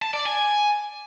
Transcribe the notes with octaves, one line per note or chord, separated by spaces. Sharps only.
A5
D5
G#5